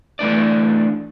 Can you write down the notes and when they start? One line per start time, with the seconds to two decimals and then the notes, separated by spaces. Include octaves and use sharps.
0.19 E3 A3 D4 D5